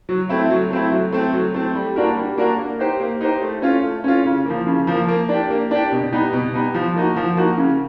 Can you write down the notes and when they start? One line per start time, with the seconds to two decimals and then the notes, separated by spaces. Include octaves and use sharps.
0.09 F#3
0.29 A3 C4 E4
0.50 F#3
0.71 A3 C4 E4
0.92 F#3
1.13 A3 C4
1.33 F#3
1.54 A3 C4
1.75 G3
1.96 A#3 D4 F#4 A#4
2.16 G3
2.37 A#3 D4 F#4 A#4
2.58 A#3
2.79 D#4 G4 C5
3.00 A#3
3.21 D#4 G4 C5
3.42 A3
3.62 C#4 F4
3.84 A3
4.04 C#4 F4
4.25 C#3
4.45 F3 A#3
4.67 C#3
4.87 F3 A#3
5.08 A#3
5.29 D4 G4
5.50 A#3
5.71 D4 G4
5.92 B2
6.12 G3 B3 D#4
6.33 B2
6.54 G3 B3 D#4
6.74 F3
6.96 A#3 D#4 F#4
7.16 F3
7.37 A#3 D#4 F#4
7.58 C#3